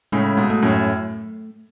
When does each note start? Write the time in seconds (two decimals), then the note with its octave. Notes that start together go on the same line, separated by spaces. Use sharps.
0.12 A2 C#3 G#3
0.37 G#2 B2
0.50 A3
0.62 F#2 A2